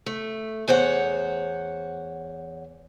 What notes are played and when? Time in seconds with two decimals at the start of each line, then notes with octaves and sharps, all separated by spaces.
0.06 A3
0.68 E2 C5 C#5 F#5